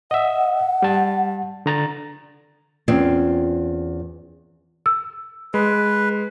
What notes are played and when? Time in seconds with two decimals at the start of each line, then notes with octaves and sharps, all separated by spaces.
0.11 D#5 E5 F#5
0.83 G3 A5
1.66 D3 A#5 A6
2.88 E2 C4 C#4 F4
4.86 E6
5.54 G#3 B4